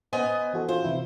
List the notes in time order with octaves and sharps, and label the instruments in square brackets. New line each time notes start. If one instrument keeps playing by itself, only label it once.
[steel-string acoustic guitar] B3 D#5 G#5 [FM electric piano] C5
[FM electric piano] E3 F#4 A4
[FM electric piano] F4 [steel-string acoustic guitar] C5
[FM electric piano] C3 E3 E4